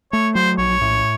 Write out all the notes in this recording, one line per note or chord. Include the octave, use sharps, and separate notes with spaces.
A3 C#5
F#3 C5
A#1 C#5
A2